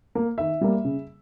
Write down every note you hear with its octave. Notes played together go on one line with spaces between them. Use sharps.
A#3
D#3 E5
G3 A#3
C#3